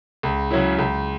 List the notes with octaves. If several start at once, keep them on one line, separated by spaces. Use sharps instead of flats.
C#2
C#3 F#3 C#4 E4
C#2